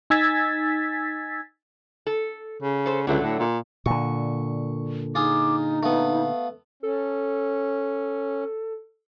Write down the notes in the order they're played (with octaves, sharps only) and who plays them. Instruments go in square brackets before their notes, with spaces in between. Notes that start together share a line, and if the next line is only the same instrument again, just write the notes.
[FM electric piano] D#4 G#5 E6 G#6 A6 B6
[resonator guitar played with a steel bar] A4
[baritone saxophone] C#3
[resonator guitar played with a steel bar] A4 C5
[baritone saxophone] C#2 [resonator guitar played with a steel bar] D3 F#3 A3
[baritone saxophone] A2
A#2
[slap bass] A#2 D3 [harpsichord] C#6
[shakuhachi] D#4 [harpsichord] F4 G#4 [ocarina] D6
[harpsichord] A3 B3 [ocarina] F5
[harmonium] C#4 [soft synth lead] A4